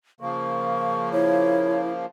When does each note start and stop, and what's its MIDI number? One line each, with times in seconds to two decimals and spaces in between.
0.21 2.06 49
0.21 2.06 53
0.21 2.06 58
0.21 1.09 85
1.13 1.91 64
1.13 1.80 73